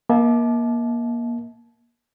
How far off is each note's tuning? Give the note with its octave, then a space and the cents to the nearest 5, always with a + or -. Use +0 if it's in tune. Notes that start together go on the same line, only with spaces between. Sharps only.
A#3 +25 E5 -45 A5 -30